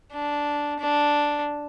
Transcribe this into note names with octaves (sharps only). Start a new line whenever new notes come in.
D4
D4